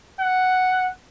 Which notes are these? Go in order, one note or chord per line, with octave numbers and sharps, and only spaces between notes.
F#5